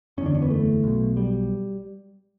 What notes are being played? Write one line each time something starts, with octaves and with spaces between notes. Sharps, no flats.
F#1 E2 D3 C#4
D4
C#4
B3
A3
B1 B2
G3